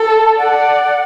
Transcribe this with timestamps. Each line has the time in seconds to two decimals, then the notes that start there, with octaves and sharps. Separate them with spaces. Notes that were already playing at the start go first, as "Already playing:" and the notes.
Already playing: A4 A5
0.38 D5 F#5